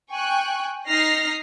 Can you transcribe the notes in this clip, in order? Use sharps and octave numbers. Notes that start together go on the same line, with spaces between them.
G5 G#5 C#6 F#6
D#4 F6 A#6 C7